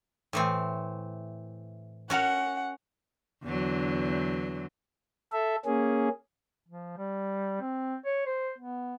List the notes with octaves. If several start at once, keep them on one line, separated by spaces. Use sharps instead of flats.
A2 E3 C4
C#4 F#4 A#4 F#5
E2 D3 F#3
A4 E5
A#3 C#4 G#4
F3
G3
C4
C#5
C5
B3